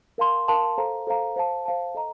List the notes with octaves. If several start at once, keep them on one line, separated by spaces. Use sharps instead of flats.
A#4 F5 A5 C6
A#4 F5 A5 C6
A4 C5 F5 A#5
A4 C5 F5 A#5
C5 F5 A5
C5 F5 A5
A4 D#5 A#5